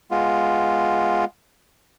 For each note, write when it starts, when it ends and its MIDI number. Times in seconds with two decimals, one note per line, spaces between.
0.11 1.25 56
0.11 1.25 59
0.11 1.25 65